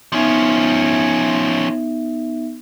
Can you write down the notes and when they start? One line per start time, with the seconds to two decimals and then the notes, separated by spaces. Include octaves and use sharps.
0.12 F3 B3 C#4 D#4 E5